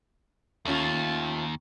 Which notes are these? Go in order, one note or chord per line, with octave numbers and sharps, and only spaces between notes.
D#2 A3 C#4 F4